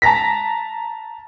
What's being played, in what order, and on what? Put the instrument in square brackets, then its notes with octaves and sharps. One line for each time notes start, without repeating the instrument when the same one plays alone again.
[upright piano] A5 A#5 A#6 B6